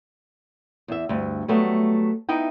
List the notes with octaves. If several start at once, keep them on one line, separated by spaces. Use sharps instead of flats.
E2 E5
D2 G2
F#3 G3 A3 B3
B3 D#4 E4 G5